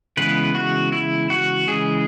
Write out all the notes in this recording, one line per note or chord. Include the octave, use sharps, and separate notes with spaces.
C#3 E3 G#3 B3 B4
F#4
E4
F#4
C#3 E3 G#3 G#4